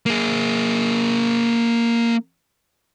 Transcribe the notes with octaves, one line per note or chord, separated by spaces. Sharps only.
A#3 G#4